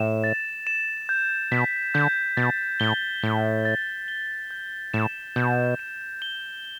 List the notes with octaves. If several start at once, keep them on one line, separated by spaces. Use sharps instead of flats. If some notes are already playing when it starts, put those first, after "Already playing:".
Already playing: A2 E7
A6
E7
G6
B2 B6
D3 G6
B2 A6
A2 G7
A2 G7
A6
G7
G6
A2 E7
B2 G6
E7
G7